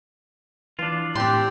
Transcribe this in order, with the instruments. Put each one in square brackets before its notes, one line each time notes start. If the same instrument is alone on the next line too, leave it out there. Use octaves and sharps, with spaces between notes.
[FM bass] E3 [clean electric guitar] D4 F4
[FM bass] A2 [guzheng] C4 C6 [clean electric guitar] D4 [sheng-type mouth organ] G4